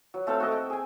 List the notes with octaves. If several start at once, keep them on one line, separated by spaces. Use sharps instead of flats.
F#3
A3 C4 A4 F5
F#4 A#4 D#5 E5
G5
G#4 G#5